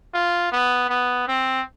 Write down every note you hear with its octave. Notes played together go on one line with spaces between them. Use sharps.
F4
B3
B3
C4